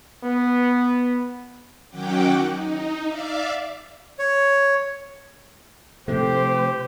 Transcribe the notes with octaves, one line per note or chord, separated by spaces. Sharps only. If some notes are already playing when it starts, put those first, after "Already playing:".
B3
D#3 F#3 C#4 F#5 G5 D6
D#4
D5 E5 F5 D6
C#5
C3 F3 A3 G4 C5